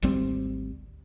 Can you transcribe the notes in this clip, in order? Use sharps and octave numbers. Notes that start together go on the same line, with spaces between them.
G#1 D2 G3 C4